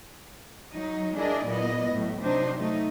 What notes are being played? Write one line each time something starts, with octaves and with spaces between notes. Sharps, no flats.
F#3 D#4
D4 E4 G#4 A#4 D5 D#5
A#2 F#3 B3 E4 D#5
A2 F#3
C3 F#3 D4 D#4 C5
F#3 A3 D#4